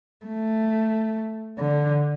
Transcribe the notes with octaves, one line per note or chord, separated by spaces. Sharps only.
A3
D3